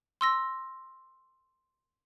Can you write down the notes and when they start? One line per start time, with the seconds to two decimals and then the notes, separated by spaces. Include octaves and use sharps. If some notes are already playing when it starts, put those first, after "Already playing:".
0.21 C6 E6 A#6